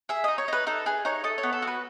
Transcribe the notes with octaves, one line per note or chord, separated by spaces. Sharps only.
G#4 E5
D#4 D#5
C#5
D#4 B4
D#4 A4
G#4 B4
D#4 C#5
A4 D#5
C#5
B3
A4
F#4 B4